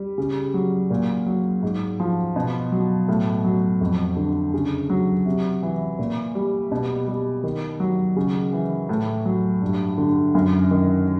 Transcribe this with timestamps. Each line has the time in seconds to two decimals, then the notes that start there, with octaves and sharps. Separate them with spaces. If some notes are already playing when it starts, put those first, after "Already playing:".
Already playing: G3
0.18 C#3
0.54 F#3
0.90 A#2
1.26 F#3
1.63 G#2
2.00 F3
2.36 B2
2.72 F#3
3.08 A2
3.44 F#3
3.81 F2
4.17 D3
4.54 C#3
4.90 F#3
5.25 C3
5.63 E3
5.99 A#2
6.35 G3
6.72 B2
7.08 G3
7.44 D#3
7.80 F#3
8.16 C#3
8.53 E3
8.89 A2
9.25 F#3
9.62 G2
9.98 D3
10.35 F#2
10.71 D#3